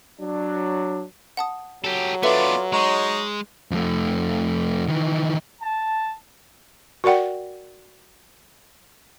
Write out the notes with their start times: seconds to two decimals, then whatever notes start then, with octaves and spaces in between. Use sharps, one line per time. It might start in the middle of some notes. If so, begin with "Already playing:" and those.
0.21 F#3 D4
1.37 F#5 A5 D#6
1.84 F#3 G4 A4
2.23 B3 D4 F4 A4 B4 D5 E5
2.72 G#3 D#4 C#5
3.71 F2 A3
4.88 D#3 E3
5.60 A5
7.04 F#4 A#4 D5 F#5 G5